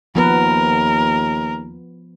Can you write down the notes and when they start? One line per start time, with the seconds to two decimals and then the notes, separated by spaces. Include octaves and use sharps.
0.15 D#2 F3 B3 A#4 B4